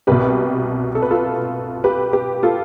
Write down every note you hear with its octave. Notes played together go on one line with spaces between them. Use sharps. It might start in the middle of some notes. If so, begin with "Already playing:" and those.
C2 B2 G4 B4
A4
B4
F4 A4
G4 B4
G4 B4
F4 A4